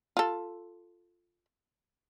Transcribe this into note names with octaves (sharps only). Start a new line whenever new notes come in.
F4 A4